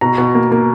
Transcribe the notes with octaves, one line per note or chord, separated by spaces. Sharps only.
B2 A#5
B2
A#3
A#3